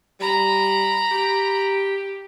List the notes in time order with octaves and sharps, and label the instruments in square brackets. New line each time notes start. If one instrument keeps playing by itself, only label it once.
[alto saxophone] G3 [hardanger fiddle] A#5 B5
[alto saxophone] G4